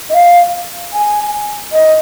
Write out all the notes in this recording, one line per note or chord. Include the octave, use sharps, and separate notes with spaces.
D#5
F5
G#5
D#5